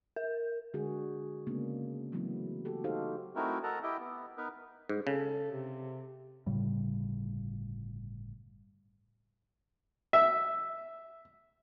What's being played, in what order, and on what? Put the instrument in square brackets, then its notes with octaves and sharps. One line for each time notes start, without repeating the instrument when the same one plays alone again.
[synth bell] A#4
[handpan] D3 G#3 D4 F#4 G#4
C#3 G#3 A#3 B3 C#4 D4
E3 F#3 A3 B3 E4
F#4 G4 A4
D#4 F#4 G4 A4 C5 F5
[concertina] A3 C4 D#4 E4 F#4 A#4
A4 A#4 D#5 F#5 A5 A#5
E4 G4 D#5 E5 G5
B3
B3 D#4 A#4 B4
[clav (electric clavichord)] G#2
[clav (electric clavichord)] C#3 [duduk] A4
[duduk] C3
[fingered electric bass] G1 A2 C#3 G3
[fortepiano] E5